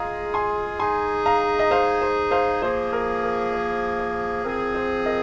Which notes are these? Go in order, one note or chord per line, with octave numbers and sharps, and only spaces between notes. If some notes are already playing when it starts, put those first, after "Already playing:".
Already playing: G#3 F4 G#4 F5 A#5
G#5 C6
G#3 D#4 G#4 G#5 C6
F5 A#5
D#5
C5 F5
C5
C5 F5
F3 A#3 G#4 C5
A#4
A#4
C5
C5
F3 C4 G#4 A#4
C5
A#4 D#5